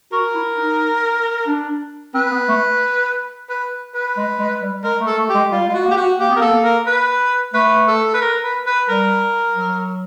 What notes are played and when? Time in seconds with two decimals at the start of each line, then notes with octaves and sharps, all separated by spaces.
0.12 F#4 A#4
0.35 E4
0.57 D#4
1.47 D4
2.14 C4 B4
2.31 B3
2.48 A3
3.49 B4
3.94 B4
4.17 G#3
4.39 G#3
4.62 G3
4.84 G#3 A#4
5.01 A3
5.06 A4
5.17 A3
5.29 G4
5.34 G#3
5.51 G3 F4
5.69 G#3 F4
5.74 F#4
5.85 A#3
5.91 G4
5.96 F#4
6.19 A#3 G4
6.30 B3
6.36 A#4
6.41 A#3 A4
6.64 A#4
6.86 B4
7.54 A3 B4
7.87 A4
8.13 B4
8.21 A#4
8.43 B4
8.66 B4
8.89 G3 A#4
9.56 F#3